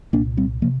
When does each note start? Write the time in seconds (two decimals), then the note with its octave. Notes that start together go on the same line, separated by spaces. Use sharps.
0.13 C2 A#2 A#3 D4
0.37 G3 C4
0.62 C3 F3 A#3